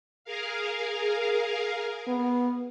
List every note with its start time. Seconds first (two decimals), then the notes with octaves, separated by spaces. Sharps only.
0.24 G#4 A#4 F5
2.08 B3